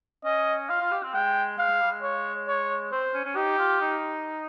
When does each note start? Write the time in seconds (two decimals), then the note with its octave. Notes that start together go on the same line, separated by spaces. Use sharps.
0.25 C#4 D#5
0.69 F4 F5
0.81 F4
0.91 G4
1.03 C4
1.14 G#3 G5
1.58 G#3 F5
1.70 G#3
1.81 G3
1.92 G#3
2.03 C#5
2.48 C#5
2.92 C4 C5
3.14 C#4
3.25 C#4
3.36 D#4 G4
3.58 F4
3.81 D#4